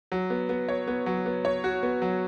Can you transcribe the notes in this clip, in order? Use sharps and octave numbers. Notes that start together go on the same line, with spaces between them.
F#3
B3
B3
C#5
B3
F#3
B3
C#5
F#4
B3
F#3